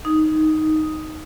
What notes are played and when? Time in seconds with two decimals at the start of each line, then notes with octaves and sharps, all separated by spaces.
0.05 D#4